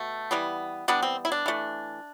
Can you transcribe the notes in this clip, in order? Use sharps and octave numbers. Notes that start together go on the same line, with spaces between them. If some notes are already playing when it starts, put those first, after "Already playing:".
Already playing: B2 A3
E3 G3 B3
E3 G3 B3 D4
C4
E4
D4
E3 A3